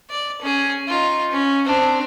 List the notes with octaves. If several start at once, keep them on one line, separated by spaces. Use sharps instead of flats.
D5
C#4 G#4
D#4 F4
C#4
C4 D4